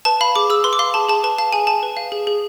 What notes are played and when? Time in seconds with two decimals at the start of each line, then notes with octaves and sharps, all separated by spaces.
0.05 B4 A5
0.21 F5 B5
0.36 G#4 D6
0.50 G#4 E6
0.64 B4 C6
0.73 D6
0.79 F5 C6
0.94 G#4 A5
1.08 G#4 A5
1.24 B4 A5
1.38 F5 A5
1.53 G#4 G#5
1.67 G#4 A5
1.83 B4
1.97 F5
2.12 G#4
2.27 G#4